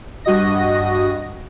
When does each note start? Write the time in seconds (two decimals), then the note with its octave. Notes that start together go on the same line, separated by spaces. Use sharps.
0.25 G2 F#4 D#5 A#6